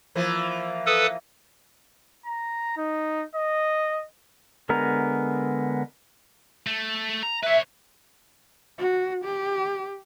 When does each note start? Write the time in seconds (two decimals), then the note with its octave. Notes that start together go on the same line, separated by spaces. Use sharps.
0.15 E3 F3 A#3
0.86 A4 B4 D#6
2.26 A#5
2.77 D#4
3.36 D#5
4.69 D3 G#3 B3 A#4 A#5
6.67 A3
7.23 A#5
7.43 B4 C#5 E5
8.78 F#4
9.25 G4